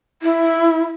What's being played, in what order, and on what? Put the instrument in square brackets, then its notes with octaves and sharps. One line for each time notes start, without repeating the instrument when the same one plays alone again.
[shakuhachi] E4